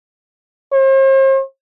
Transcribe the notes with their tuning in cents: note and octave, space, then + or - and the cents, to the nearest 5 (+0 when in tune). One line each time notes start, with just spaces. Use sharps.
C5 +45